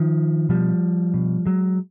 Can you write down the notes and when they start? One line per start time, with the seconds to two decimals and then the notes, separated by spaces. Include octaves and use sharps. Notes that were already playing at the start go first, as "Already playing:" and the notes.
Already playing: D#3 F3
0.49 B2 F3 G3
1.14 B2
1.46 F#3 G#3